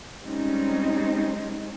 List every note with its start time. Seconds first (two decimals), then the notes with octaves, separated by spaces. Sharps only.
0.23 G3 G#3 C4 C#4 D#4